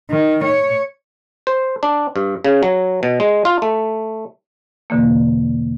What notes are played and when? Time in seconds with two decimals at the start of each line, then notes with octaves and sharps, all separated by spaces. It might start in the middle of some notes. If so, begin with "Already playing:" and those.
0.10 D#3
0.45 C#5
1.47 C5
1.83 D4
2.16 G2
2.44 C#3
2.63 F#3
3.03 B2
3.20 G#3
3.45 F4
3.62 A3
4.90 E2 B2 D3 E3 A#3